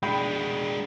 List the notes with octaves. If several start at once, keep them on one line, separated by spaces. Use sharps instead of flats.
G#3 D4 G5 B5